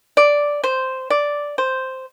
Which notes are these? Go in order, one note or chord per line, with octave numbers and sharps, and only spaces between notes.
D5
C5
D5
C5